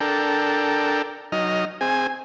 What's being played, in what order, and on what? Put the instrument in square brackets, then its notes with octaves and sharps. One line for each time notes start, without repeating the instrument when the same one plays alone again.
[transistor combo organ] D4 A4 A#4 G5
F#3 D#4 D#5 F6
C4 G#4 G#5